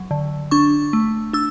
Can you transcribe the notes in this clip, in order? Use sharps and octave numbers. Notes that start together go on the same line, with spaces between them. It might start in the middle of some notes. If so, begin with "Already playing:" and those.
Already playing: F#3
D3
D4 C#6
A3
D4 E6